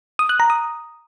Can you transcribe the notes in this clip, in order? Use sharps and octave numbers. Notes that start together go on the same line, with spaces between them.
D#6
F#6
A#5
D#6